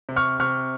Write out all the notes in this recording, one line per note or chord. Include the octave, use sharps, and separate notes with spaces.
C3
C#6 F6
C3 C#6 F6